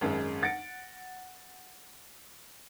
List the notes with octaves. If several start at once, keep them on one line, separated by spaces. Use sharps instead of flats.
G#1 F#2 G#3
F#5 A6 A#6 C#7 D7